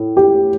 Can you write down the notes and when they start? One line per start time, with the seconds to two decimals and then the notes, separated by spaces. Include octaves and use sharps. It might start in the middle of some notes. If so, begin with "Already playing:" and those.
Already playing: A2
0.17 G4